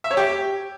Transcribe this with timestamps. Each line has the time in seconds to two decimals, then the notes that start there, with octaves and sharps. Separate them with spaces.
0.04 E5
0.11 C#5
0.17 G4